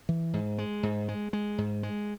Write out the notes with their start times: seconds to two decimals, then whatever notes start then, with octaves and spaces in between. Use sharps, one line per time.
0.09 E3
0.34 G#2
0.58 G#3
0.83 G#2
1.08 G#3
1.33 G#3
1.58 G#2
1.83 G#3